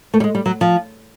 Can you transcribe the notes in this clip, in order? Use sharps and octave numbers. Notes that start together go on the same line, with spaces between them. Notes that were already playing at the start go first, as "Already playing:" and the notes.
A3
G3
G#3
G3
F#3
F3